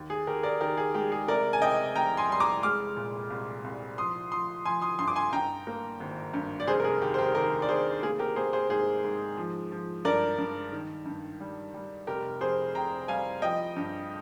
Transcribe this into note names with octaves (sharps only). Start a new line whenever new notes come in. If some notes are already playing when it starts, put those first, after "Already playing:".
Already playing: D#2
G#4
D#2 G4 A#4
A#4 D5
D#3 G4 A#4
G#4
G#3 G4
G#4
C3 A#4 D5
G#5
C3 D#5 G5
F1 G5 A#5
G#5 C6
G3 C6
A#5 D6
G#3 D6 F6
A#2
C2
C2
F3 C6 D#6
F3 C6 D#6
F3 G#5 C6
C6 D#6
G2 C6 D#6
D6
G#5 C6
G2 G5 A#5
A#3
G#1
G2
D5
F1 G#4 C5
A#4
G#4
D#2 G4
C5
G4 A#4
D#3 G4 A#4
D5
F1 G#4 C5
A#3 G#4
G4 A#4
A#3 G#4 C5
G#4 C5
G#2 G#4 C5
G#2
F3
F3
G2 A#4 D5
G2
D#3
G2
G3
G3
F1 G4 A#4
F2 G#4 C5
F1 G5 A#5
G3 F5 G#5
F3 D#5 G5
G2